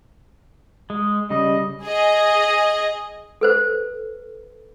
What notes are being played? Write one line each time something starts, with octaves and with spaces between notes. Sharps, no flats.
G#3
C#3 G3 D#5
G#4 D#5
A4 B4 C5